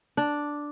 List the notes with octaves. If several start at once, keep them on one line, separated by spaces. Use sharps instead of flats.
D4